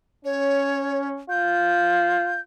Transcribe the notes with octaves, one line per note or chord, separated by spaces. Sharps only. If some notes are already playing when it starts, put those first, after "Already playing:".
C#4 C#5
F4 G6